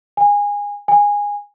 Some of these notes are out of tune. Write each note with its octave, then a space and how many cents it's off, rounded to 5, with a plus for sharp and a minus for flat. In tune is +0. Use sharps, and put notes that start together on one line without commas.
G#5 -20
G#5 -15